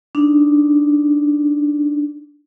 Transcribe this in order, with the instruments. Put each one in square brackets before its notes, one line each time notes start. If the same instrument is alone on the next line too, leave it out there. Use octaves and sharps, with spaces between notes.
[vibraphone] D4 D#4